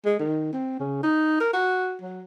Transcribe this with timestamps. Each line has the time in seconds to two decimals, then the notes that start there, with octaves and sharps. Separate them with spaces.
0.05 G#3
0.20 D#3
0.53 C4
0.80 C#3
1.03 D#4
1.40 A#4
1.54 F#4
2.02 F#3